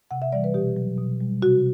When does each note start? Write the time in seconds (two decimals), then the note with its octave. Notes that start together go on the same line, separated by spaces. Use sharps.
0.11 C3 F#5
0.22 E5
0.32 E3 G3 D5
0.44 B4
0.54 B2 G4
0.76 F#3
0.98 B2
1.21 G3
1.42 C3 F#4